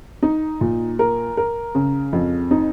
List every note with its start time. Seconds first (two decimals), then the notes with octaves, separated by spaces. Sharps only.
0.23 D#4
0.61 A#2
0.99 A#4
1.37 A#4
1.75 C#3
2.13 F2
2.51 D#4